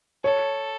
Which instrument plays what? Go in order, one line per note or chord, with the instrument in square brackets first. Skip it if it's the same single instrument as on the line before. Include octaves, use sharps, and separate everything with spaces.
[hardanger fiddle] A4 [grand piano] C#5